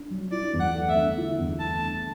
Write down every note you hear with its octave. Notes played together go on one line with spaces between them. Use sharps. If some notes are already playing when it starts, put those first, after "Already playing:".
Already playing: D4
F#3
E4 D5
E2
F#5
A3
E5
D3
E4
E2
A3 A5
D3